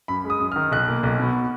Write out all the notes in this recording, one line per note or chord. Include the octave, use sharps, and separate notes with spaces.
F#2 B5
G#3 D#6
F#2
F6
D#3
B1 F#6
A#3
B1
B2